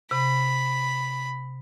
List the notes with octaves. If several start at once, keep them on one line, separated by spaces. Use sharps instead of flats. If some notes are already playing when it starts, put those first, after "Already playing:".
C3 B5